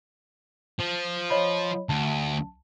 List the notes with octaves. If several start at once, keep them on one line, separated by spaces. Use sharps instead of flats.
F3
C#5 D#5 B5
D2 A5